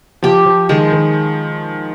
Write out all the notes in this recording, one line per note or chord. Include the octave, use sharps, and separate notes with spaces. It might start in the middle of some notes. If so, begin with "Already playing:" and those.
F3 G4
F3
D#3 G#3
D#3